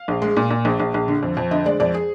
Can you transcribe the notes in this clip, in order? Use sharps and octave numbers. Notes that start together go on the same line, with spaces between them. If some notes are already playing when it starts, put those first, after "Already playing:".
Already playing: F5
A#1
G#3
A#2
A#2
A#1
A#1
A#1
D3
F2
F2
D3 D#5
G#3 D5
F2 D5
G#4